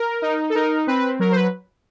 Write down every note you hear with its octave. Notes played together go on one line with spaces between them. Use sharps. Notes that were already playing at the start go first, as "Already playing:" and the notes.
Already playing: A#4
D#4
A4
D#4 A#4
C4 B4
F#3 A#4
C5
B4